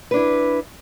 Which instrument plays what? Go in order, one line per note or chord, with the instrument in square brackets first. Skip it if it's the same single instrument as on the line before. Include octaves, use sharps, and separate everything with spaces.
[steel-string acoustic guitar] B4
D4
E4